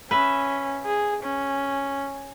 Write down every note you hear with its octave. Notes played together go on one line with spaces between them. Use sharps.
C#4 B4 E5
G#4
C#4